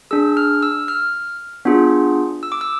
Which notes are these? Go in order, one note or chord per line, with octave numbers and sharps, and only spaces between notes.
D4 G#4 E6
F6
E6
F6
B3 D4 F4 G#4
E6
D6
E6